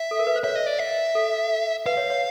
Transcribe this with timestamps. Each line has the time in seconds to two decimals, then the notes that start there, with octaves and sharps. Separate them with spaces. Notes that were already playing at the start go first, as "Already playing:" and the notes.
Already playing: E5
0.11 A4
0.19 A#4
0.27 B4
0.36 C5
0.44 C#5 E5
0.56 D#5
0.66 D5
0.79 E5
1.15 A4
1.86 B4 F5
1.97 C#5
2.10 C#5